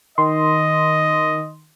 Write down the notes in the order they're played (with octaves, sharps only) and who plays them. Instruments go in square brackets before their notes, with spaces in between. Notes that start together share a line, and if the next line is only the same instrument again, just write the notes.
[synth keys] D#3 [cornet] D#5 [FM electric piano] C6